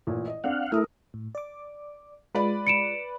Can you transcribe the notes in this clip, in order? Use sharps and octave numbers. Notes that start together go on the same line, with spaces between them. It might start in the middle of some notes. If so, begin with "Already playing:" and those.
A1 A#2
D#5
C4 D4 F5 F#5
A3 E4 A#4 D#6 F6
A2
D5 D6
G#3 F4 B4 D5 B5
C#7 D7 E7